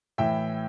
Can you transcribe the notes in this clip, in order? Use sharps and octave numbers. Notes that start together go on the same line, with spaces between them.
A2 E3 E5 G5